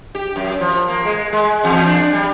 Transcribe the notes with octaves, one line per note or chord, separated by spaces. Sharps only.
G4
F#2
F3
A#3
G#3
G#3
E2
D4
G3